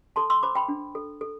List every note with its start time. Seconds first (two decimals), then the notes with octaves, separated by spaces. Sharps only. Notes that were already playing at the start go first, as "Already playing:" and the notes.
0.16 A4 A5 C6
0.30 C6 E6
0.43 C5 B5 D6
0.55 G5 B5
0.68 D4
0.95 A4
1.21 A4